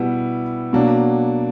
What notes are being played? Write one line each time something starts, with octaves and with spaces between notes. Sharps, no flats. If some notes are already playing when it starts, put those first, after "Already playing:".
Already playing: B2 G3 B3 E4
B2 F#3 A#3 D4